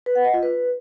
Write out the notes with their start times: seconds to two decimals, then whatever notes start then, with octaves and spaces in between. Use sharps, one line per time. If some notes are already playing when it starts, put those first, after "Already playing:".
0.06 B4
0.15 F#5
0.24 D#5
0.34 F4
0.43 B4